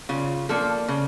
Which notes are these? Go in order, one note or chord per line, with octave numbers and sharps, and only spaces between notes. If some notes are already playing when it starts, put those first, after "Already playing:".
C#3 F4
F3 A#3 D4 A4
C#3